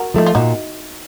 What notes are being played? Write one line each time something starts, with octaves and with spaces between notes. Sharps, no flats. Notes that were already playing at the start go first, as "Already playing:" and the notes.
Already playing: F#4 A#4
F3 A3 D#4
F4
A#2 D#4 F#4